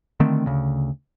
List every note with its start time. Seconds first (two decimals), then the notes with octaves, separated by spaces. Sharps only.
0.20 D3 D#3 A3 C4
0.46 D2 C#3